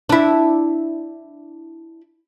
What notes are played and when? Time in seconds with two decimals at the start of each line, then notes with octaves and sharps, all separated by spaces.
0.09 D4 E4